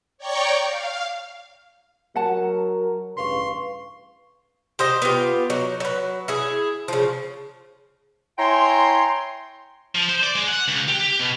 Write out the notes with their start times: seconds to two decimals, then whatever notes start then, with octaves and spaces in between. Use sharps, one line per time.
0.18 C#5 D5 G5 A#5 C#6 G6
0.66 F5
2.16 F#3 A#4 F#5 A5
3.17 A1 G2 C#3 B4 F5 C6 C#6
4.79 G4 C5 D#5
5.02 B3 F4 G4
5.50 F#3 D#4
5.80 F#3 B4
6.28 E4 G#4
6.88 C#3 F3
8.38 E4 C#5 G5 G#5 A#5 C6
9.95 F3
10.09 C5
10.23 D5
10.35 G#3
10.48 F#5
10.68 C#2
10.88 G4
11.01 G4
11.19 B2